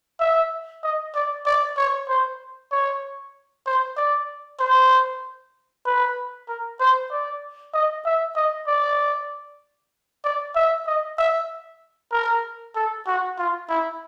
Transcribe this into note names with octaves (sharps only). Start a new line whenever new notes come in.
E5
D#5
D5
D5
C#5
C5
C#5
C5
D5
C5
B4
A#4
C5
D5
D#5
E5
D#5
D5
D5
E5
D#5
E5
A#4
A4
F#4
F4
E4